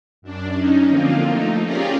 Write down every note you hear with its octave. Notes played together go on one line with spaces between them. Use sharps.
F#2 D4
C#4 D#4
D3 F3 A#3 C4 F4
A3 D#4
C#4 F4 G4 G#4 A#4 D5